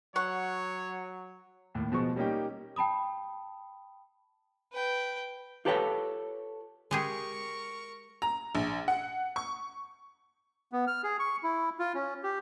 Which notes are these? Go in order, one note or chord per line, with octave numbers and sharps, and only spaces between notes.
F#3 C#5 F#5 C#6
D#2 A2
B2 F3 G#3 C#6
G3 A#3 C#4 D#4 G4 G5
G5 A5 B5 D#6
B4 G5
F4 G4 A4 B4 C#5 G5
G#3 G4 G#4 A#4 C#6
A#5
A#1
F#5
C#6
B3
F6
G#4
C#6
E4
F4
C#4
G4